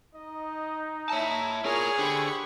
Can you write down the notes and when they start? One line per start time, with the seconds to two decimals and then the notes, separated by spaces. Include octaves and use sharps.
0.15 D#4 D#5
1.10 E4 C#5 E5 A5 A#5
1.65 F4 G#4 A#4 C#5 F6
1.99 D3 G4 C5 B5 C#6